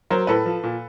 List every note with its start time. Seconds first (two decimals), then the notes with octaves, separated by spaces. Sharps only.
0.10 F#3 A#4 C5
0.27 A2 A4 B4
0.46 F3
0.63 A#2